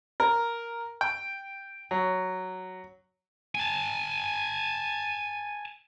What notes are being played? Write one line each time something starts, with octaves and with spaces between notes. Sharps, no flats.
A#4
G5
F#3
G#5 A5